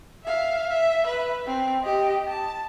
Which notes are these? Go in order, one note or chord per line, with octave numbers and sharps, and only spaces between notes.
E5 F5
E5
B4
C4
G4 D#5
A5